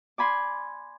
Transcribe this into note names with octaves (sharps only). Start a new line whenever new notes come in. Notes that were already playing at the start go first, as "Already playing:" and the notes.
D5 G#5 B5 C6